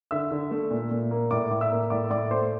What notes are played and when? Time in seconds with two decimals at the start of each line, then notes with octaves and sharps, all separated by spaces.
0.11 D3 E5 E6
0.31 D3
0.51 A3
0.71 A#2
0.91 A#2
1.11 A#3
1.31 A2 D5 D6
1.51 A2
1.61 E5 E6
1.71 A#3
1.90 A2 D5 D6
2.10 A2 D5 D6
2.31 A3 C5 C6